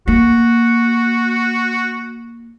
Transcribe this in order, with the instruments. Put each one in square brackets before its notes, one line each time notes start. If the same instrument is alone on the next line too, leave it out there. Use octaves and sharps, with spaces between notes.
[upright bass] A#3 [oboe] F#4